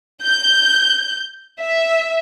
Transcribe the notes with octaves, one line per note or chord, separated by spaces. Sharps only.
G6
E5